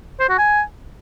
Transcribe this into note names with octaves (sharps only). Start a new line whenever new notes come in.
C5
F#4
G#5